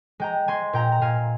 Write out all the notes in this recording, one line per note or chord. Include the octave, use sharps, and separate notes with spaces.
G#3 G5 A#5
G#3 G#5 C6
A#2 G5 A#5
A#5
A#2 F5 G#5